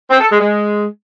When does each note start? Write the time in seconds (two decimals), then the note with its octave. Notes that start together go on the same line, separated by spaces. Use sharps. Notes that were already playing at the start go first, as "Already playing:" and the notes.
0.10 C4
0.20 A4
0.30 G#3
0.40 G#3